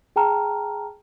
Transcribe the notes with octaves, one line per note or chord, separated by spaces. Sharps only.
G#4 G5 A5 A#5 F6